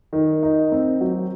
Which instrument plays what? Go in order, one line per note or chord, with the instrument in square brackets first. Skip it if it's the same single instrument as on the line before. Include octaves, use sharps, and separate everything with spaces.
[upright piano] D#3
D#4
C4
F#3